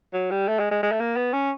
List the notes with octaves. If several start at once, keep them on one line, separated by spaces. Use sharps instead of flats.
F#3
G3
A3
G#3
G#3
G#3
A3
A#3
B3
C#4